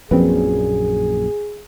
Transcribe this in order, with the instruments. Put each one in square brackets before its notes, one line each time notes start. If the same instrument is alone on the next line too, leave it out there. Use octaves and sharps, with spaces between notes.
[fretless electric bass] A#1 F#2 A#2 [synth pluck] F3 C4 B4 [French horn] G#4